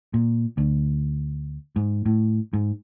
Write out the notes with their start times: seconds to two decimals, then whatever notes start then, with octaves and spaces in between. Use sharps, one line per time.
0.14 A#2
0.58 D2
1.76 G#2
2.06 A2
2.53 G#2